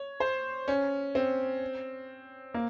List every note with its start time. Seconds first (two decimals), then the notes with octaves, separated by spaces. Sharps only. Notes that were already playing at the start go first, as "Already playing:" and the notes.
Already playing: C#5
0.20 C5
0.68 C#4
1.15 C4
2.54 A#3